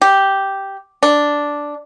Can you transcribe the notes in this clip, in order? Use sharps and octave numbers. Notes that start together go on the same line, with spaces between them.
G4
D4